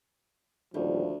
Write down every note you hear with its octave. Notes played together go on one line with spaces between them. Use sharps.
D#1 D2 F3 G3